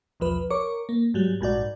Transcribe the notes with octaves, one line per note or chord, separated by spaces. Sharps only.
B1 E2 F3 B4
A#4 C#5 C#6 D6
A#3
G#2 F#3 G3
A#1 G#2 F#4 D5